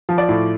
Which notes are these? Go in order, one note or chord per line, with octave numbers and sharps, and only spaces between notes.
F3
D5
A2